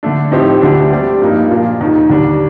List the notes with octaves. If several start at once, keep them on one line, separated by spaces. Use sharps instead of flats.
D3 A3 D4
A2 F3 C4 D#4 G4
D2 D3 A3 D4 G4
G3 C4 G4 D5
G2 F3 A#3 D#4
A#2 F3 A#3 D4 F4
D#2 D#3 A#3 D#4
D#2 D3 G3 D4